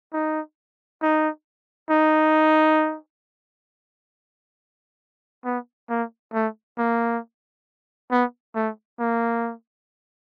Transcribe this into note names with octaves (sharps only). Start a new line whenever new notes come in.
D#4
D#4
D#4
B3
A#3
A3
A#3
B3
A3
A#3